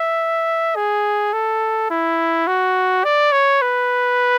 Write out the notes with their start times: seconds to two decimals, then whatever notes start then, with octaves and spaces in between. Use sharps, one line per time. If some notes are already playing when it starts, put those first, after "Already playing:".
Already playing: E5
0.76 G#4
1.33 A4
1.91 E4
2.47 F#4
3.04 D5
3.32 C#5
3.62 B4